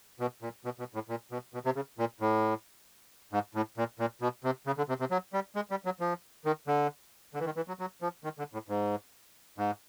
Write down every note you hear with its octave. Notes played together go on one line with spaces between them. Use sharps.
B2
A#2
B2
B2
A2
A#2
B2
B2
C3
C#3
A#2
A2
G#2
A2
A#2
A#2
B2
C3
C#3
D3
C3
C3
F#3
G3
G#3
G3
F#3
F3
D#3
D3
D3
E3
D#3
E3
F#3
F#3
F3
D#3
D3
A2
G#2
G#2